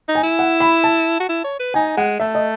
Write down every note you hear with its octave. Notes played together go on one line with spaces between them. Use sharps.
D#4
G#5
E4
F#5
B5
A5
F#4
E4
C#5
B4
D#4 G#5
G#3 F#5
A3 E5
D#5